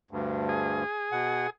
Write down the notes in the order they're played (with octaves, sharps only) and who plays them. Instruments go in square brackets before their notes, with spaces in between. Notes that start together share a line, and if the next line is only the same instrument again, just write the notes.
[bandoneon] D2 G2
[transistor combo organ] G#4
[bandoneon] B2 F#5